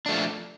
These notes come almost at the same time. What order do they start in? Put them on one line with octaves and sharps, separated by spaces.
D4 A3 F3